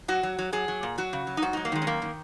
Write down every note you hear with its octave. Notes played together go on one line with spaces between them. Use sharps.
F#3 F#4
F#3
F#3
F#3 G#4
F#3
A#2
F#3 F#4
C#3
F#3
D#4
G#2 F#4
F#3 D#4
A#3
D#3 G#3
C#4
F#2 A#3
D#3